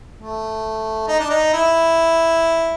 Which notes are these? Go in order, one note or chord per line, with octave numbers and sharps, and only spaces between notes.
A3
D#4
D4
D#4
E4